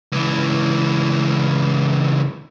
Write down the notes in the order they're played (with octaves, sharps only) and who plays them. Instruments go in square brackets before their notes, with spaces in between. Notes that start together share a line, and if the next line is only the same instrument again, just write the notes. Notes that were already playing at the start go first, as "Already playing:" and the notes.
[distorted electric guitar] C#2 E3